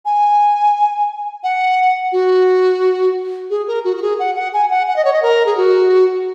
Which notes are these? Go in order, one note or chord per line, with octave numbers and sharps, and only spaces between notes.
G#5
F#5
F#4
G#4
A#4
F#4
F#4
G#4
F#5
F#5
G#5
F#5
F#5
D#5
C#5
D#5
A#4
G#4
F#4